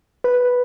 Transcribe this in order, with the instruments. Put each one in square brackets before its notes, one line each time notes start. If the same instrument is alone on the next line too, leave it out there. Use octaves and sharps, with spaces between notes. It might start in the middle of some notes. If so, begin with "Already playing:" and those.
[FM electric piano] B4